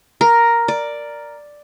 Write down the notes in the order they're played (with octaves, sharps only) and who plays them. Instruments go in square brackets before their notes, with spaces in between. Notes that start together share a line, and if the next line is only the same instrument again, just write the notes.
[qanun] A#4
D5